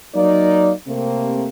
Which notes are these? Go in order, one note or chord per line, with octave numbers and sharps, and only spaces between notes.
F#3 A#3 D#4 D5
C3 A3 A#3 C4